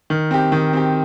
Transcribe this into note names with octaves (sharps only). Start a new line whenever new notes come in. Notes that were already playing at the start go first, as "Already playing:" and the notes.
D#3
C4 G4
D#3
C4 G4